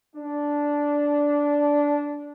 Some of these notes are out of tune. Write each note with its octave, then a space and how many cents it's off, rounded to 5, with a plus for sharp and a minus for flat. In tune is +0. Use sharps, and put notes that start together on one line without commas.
D4 -10